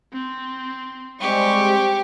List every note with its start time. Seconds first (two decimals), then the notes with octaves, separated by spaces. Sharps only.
0.13 C4
1.21 G3 G#3 C4 G4 C#6